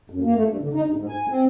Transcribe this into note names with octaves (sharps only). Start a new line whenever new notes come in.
F#2
A#3
A3
G2
D3
D#4
G2
G#2
G#5
C4